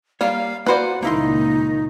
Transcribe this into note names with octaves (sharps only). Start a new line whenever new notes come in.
G3 A#3 C#5 F5
A#3 F#4 B4 C5 D5 F#5
C#2 A#2 D#3 A#3 D#4 E4 C6